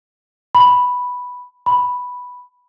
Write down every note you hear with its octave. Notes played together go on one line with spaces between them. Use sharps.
B5
B5